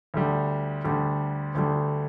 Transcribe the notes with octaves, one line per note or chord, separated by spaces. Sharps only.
D2 D3 G3
D2 D3 G3
D2 D3 G3